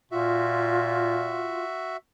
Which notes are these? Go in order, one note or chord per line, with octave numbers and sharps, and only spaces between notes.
A#2 F4 F#4 E5